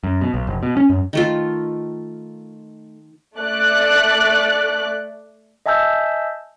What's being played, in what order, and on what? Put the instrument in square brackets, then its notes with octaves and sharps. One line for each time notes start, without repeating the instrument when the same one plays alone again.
[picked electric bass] F#2
B2
B1
F1
B2
C#4
F#2
[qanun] D#3 A3 F4
[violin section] A3 D5 F#6
[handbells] D#5 E5 G#5 A5 E6 G6